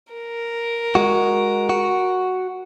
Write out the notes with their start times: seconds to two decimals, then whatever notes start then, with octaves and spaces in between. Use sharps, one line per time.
0.13 A#4
0.95 G#3 F#4
1.69 F#4